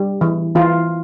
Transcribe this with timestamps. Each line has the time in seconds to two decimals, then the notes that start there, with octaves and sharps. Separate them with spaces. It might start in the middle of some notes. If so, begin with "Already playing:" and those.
Already playing: G3
0.21 E3
0.55 E3 F4